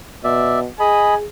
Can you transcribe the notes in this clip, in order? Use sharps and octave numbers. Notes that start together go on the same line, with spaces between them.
B2 D5 E5
G#4 D#5 G#5 B5